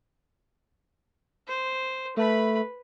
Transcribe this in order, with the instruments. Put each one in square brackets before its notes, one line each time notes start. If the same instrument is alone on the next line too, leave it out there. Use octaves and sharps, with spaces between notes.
[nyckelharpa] C5
[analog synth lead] A3 [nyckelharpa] B4 B5